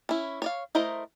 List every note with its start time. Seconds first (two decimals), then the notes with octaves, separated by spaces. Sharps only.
0.09 C#4 E4
0.42 C#5 D5 F5
0.75 A3 E4 A#4 C5 D#5